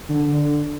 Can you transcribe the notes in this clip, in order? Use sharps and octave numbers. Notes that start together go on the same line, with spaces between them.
D3